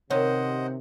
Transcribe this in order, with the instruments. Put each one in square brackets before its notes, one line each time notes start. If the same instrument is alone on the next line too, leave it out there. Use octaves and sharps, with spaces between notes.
[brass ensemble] C3 [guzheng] D#3 C4 C#4 [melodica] C5 D#5 F#5 [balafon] C#5